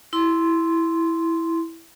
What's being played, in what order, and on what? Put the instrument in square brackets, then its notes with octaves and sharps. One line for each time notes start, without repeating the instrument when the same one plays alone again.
[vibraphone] E4 C6